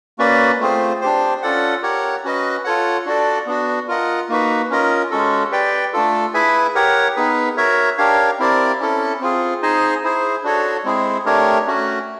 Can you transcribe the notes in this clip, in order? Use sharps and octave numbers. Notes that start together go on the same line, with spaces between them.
A#3 C#4 F#4 B4 D5
A3 C4 F4 G#4 C5
D4 G4 C5
C#4 F4 A4 D5 F#5
G4 A#4 C#5 F#5
C#4 F#4 B4 D#5
F4 A4 C#5 F#5
D4 F#4 A4 D5
B3 D4 F#4
F4 A#4 D#5 F#5
A#3 D#4 F#4 B4
C#4 F4 A#4 D#5
G#3 C#4 F#4 A4
G4 B4 D5 G5
A3 D4 F4 A4
E4 G#4 B4 E5 G#5
G4 A#4 C#5 F#5
B3 D#4 G#4 B4
F#4 A#4 C#5 E5
D4 G4 A#4 C#5 F5
C4 E4 G4 A#4 D5
C#4 E4 A4
C4 F4 G#4
D#4 G#4 C5 D#5 G#5
E4 G#4 C5
D4 F#4 A4 C#5
G#3 C4 E4 G#4
A3 D4 G4 A#4 C#5
A3 C#4 F#4